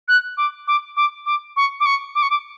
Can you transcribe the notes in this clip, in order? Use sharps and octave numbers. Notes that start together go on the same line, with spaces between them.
F#6
D6
D6
D6
D6
C#6
D6
C#6
D6
C#6
D6